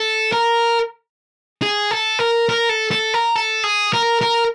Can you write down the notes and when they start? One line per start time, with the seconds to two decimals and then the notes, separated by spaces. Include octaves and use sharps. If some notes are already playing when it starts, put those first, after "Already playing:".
Already playing: A4
0.33 A#4
1.62 G#4
1.91 A4
2.19 A#4
2.49 A#4
2.69 A4
2.91 A4
3.14 A#4
3.35 A4
3.64 G#4
3.93 A#4
4.21 A#4